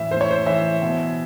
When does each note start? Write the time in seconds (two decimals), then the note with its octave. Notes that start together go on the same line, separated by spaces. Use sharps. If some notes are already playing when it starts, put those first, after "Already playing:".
Already playing: A2 E3 E5
0.11 A2 C5
0.21 C#5
0.31 C5
0.46 E3 E5
0.82 B2